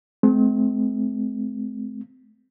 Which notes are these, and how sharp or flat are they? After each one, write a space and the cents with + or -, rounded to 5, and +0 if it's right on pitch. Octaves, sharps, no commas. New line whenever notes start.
G#3 +45 C4 -25